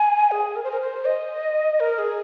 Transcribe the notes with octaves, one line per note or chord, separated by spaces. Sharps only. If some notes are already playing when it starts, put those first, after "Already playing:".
Already playing: G#5
G#4
A#4
C5
A#4
C5
D#5
A#4
G#4